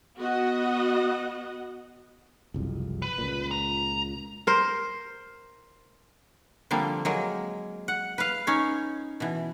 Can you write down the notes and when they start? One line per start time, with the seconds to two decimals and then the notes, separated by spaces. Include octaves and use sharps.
0.18 B3 F#4 D#5 F#5
2.54 F#1 C2 F2
3.02 B4
3.18 C#2 A#2
3.51 A#5
4.47 A#4 C5
6.71 D3 F3 G3 A#3 C4
7.05 F#3 G#3 A#3
7.88 F#5
8.18 B4 F5
8.47 C#4 D#4 C#5
9.20 B2 E3